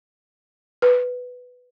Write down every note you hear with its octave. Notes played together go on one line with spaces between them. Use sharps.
B4